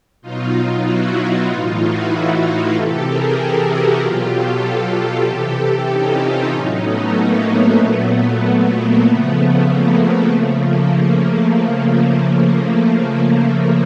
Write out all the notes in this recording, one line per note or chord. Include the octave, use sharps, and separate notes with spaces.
B2 F#3 D#4 F4
E4 F#4
D#4 F4
A2 E3
E4 F#4
E4 F#4
C3 E3 G4 A4
G#4 A#4
G4 A4
F#4 G#4
B2 F#3 F4 G4
G4 A4
G4 A4
C3 E3 G4 A4
G4 A4
C#4 D#4
D#4 F4
A2 F#3 C#4 D#4
A3 B3
A#3
A#2 F#3 A3 B3
A#3
C#3 F3 A3 B3
A#3
A#3
C#3 F3 A3
A#3